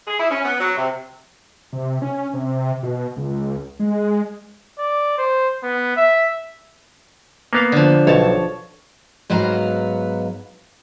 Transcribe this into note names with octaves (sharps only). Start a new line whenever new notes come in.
G#4
E4
C#4
B3
F#3
C3
C3
C#4
C3
B2
C#2
G#3
D5
C5
B3
E5
A#3 B3 F5
D3 F3
B1 C#5 A5
G#2 F#3 B3 B4 F5 A#5